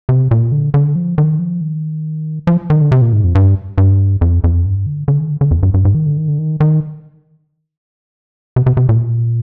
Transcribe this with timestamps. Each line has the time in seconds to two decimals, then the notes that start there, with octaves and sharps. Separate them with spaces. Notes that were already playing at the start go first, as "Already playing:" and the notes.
0.09 C3
0.31 A#2
0.52 D3
0.74 D3
0.96 F3
1.18 D#3
1.39 F3
1.61 D#3
2.47 F3
2.70 D#3
2.81 D3
2.92 C3
3.02 A#2
3.13 G#2
3.24 F2
3.35 G2
3.78 G2
4.21 F2
4.44 F2
4.66 G2
4.86 D3
5.08 D3
5.20 D#3
5.30 D3
5.41 D3
5.51 F2
5.63 G2
5.74 G2
5.85 G#2
5.95 D#3
6.06 D3
6.17 D#3
6.28 D3
6.38 D#3
6.60 D#3
8.56 C3
8.66 C3
8.77 C3
8.89 A#2